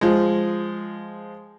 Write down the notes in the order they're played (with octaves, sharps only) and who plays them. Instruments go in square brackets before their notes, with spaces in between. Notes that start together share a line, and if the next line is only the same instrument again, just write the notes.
[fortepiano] F3 G#3